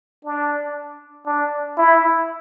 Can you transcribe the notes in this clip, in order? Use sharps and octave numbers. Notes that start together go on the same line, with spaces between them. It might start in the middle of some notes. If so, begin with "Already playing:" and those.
D4
D4
E4